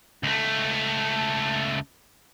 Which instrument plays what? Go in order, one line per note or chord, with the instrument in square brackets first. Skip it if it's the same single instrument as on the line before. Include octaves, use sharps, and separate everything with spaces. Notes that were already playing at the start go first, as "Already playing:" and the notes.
[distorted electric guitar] C#2 A3